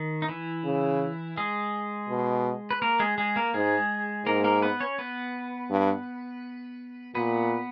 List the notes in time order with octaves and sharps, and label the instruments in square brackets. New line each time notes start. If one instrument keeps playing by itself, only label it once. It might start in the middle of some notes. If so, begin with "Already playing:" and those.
Already playing: [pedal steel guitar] D#3
D#4
E3 E4
[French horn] C#3
[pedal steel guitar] G#3 G#4
[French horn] B2
[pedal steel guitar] B4
A#3 A#4
G#3 G#4
G#3 G#4
A#3 A#4
[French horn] G#2 [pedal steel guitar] G#3 G#4
[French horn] G#2 [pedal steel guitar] A#3 A#4
[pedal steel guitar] A#3 A#4
B3 B4
C#4 C#5
B3 B4
[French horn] G2
[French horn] A#2 [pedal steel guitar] B3 B4